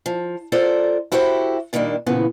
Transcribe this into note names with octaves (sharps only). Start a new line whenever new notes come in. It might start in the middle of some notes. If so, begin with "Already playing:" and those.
F3
F4 A4 A#4 C5 D5
E4 F#4 G4 A4 C5
A#2 D#3 G3 A#3 D4
A#2 C#3 E3 F3 B3